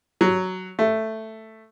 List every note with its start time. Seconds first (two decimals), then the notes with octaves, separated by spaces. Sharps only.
0.21 F#3
0.79 A3